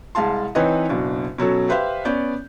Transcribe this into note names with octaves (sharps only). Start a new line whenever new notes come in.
C2 G#3 F5 A5 C6
E3 C4 D#4 B4 C#5 D#5
F#1 B2 D4
B2 F#3 C#4 A4
G4 B4 C5 E5 F5
B3 C#4 D5 G6